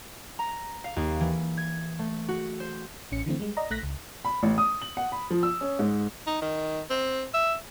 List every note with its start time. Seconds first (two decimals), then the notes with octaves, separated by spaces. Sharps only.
0.39 A#5
0.84 F5
0.96 D#2
1.20 E3
1.57 G#6
1.99 A3
2.28 F#4
2.60 C5
3.12 A1 C#4 C#7
3.26 D3 E3 A3 C4
3.39 G3 G#3
3.57 D5 D#5 A#5
3.70 A#1 A3 F#6 A#6 B6
3.83 C#2
4.25 B5
4.43 A1
4.58 D#6
4.82 F#7
4.97 F#5
5.12 B5
5.31 F3
5.43 E6
5.61 C#4
5.79 G#2
6.27 D#4
6.42 D#3
6.90 C4
7.34 E5